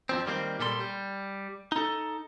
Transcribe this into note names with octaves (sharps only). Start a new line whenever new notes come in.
F2 F3 C4
D#3 G3 A#3 C4
A#2 G3 A4 C6
G3
D#4 A4